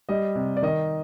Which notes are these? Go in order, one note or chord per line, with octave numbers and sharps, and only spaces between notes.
G3 D#5
C3
D5
D#3 D#5